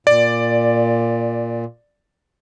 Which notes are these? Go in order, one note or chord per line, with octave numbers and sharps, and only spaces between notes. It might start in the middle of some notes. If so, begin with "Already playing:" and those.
A#2 D5